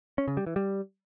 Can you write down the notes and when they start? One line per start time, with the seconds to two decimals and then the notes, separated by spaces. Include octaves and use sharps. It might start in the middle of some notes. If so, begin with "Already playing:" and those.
0.18 C#4
0.28 C#3
0.37 G3
0.47 E3
0.56 G3